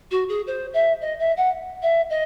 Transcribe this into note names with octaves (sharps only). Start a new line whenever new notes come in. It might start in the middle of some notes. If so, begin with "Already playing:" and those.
F#4
G#4
C5
E5
D#5
E5
F#5
E5
D#5